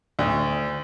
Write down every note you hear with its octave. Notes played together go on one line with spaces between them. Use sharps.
D2